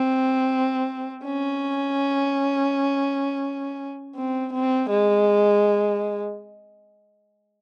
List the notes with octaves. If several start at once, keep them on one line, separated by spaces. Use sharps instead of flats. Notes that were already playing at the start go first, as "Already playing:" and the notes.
Already playing: C4
C#4
C4
C4
G#3